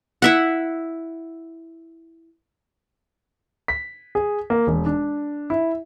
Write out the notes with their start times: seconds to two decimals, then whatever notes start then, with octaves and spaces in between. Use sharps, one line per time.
0.22 E4 E5 F#5
3.68 B6
4.15 G#4
4.50 A#3
4.67 E1
4.86 D4
5.50 E4